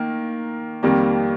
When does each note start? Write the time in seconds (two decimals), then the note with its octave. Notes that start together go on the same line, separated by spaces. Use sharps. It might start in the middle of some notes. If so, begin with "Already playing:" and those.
Already playing: D#3 A#3
0.83 F2 D#3 G3 A#3